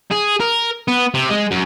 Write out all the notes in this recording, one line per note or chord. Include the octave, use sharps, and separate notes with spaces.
G#4
A#4
B3
C3
G#3
F#2